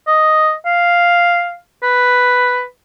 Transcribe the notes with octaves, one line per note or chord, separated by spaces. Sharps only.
D#5
F5
B4